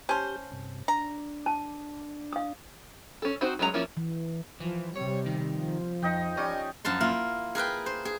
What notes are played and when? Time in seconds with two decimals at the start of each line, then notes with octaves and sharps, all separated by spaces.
0.09 C#4 G4 C5 A5 G6
0.52 G2 C3
0.88 D4 A#5
1.46 A5
2.33 F5 D#6
3.22 C#4 A4
3.41 C4 D#4 F#4 C5
3.59 F#3 G#3 C#4 G4 A#5
3.74 F3 A#3 C#4 E4 F4
3.97 E3
4.61 E3 F3
4.96 C3 G3 C#5
5.26 D#3
5.56 F3
6.03 F2 D#4 D#5 G5
6.37 G3 C#4 D#5 C#6
6.85 F#2 F3 A5 C6
7.00 A#3 E4 F4
7.55 G#4 A#4 B4 G5
7.86 C5
8.05 G#4